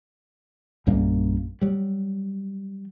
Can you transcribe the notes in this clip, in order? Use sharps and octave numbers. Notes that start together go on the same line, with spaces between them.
A#1 F#2 G3 A#3
F#3 G3